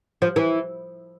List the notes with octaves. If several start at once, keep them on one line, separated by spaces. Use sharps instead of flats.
F3
E3